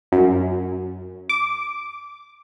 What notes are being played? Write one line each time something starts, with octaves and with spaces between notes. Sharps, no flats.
F#2
D6